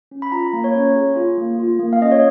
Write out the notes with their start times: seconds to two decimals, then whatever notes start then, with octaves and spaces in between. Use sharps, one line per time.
0.11 C#4
0.22 B5
0.32 F4 A#5
0.53 A#3
0.64 C#5
0.75 C#4
0.96 G#4
1.16 F4
1.38 A#3
1.59 F4
1.79 A#3
1.93 F5
2.00 C#4 D#5
2.12 C#5